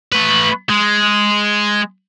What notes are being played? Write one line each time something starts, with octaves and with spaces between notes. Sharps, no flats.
A3 B4
G#3